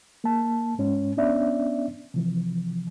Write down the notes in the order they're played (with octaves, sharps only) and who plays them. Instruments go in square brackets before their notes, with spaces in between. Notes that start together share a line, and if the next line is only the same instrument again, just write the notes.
[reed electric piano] A#3 A5
G#2 C#4
B3 C#4 D4 D5 E5
C3 E3 F3